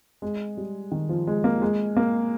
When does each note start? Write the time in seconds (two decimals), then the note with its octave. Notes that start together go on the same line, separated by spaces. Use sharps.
0.22 G#3
0.57 G3
0.92 D#3
1.09 F3
1.27 G#3
1.44 A#3
1.62 G#3
1.96 A#3